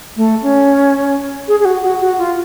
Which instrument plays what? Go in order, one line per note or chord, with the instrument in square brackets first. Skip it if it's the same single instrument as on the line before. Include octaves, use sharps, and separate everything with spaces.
[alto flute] A3
C#4
G#4
G#4
F#4
F#4
F#4
F4